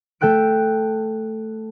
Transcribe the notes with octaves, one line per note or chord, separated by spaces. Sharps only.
A3 A4 G5 F#6 D7